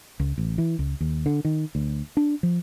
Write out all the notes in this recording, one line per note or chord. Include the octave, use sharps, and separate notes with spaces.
C#2
A1
E3
C#2
D#2
D3
D#3
D2
D4
F3